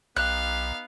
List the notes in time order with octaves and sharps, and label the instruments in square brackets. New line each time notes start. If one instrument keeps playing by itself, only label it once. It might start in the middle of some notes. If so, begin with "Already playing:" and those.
[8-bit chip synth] B1 [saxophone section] B3 D#4 G4 [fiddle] F5 [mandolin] F#6